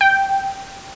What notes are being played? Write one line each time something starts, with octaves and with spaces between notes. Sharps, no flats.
G5